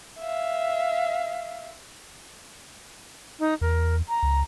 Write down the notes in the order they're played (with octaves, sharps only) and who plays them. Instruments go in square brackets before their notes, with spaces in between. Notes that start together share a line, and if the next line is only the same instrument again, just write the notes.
[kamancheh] E5 F5
[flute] D#4
[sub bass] E2 [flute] A#4
[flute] A#5
[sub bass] C#2